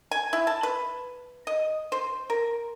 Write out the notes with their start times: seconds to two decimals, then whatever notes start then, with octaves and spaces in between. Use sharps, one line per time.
0.11 G#5
0.33 E4
0.47 A5
0.63 B4
1.47 D#5
1.92 C5
2.30 A#4